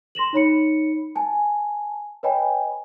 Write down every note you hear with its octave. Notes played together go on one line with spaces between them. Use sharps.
C6 A#6 E7 F#7
D#4 C#5 B5 C#7
G#5 A5
B4 C#5 D#5 G5 G#5 B5